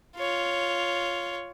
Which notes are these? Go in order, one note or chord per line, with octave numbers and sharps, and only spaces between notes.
F4 C#5